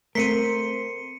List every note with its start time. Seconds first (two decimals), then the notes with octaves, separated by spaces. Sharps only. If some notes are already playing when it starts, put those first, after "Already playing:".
0.15 A3 C4 A#4 C6 B6 C#7 D#7